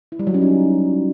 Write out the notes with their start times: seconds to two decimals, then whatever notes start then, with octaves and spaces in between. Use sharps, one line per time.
0.12 E4
0.19 G3
0.27 F#3
0.34 C#4
0.42 D#4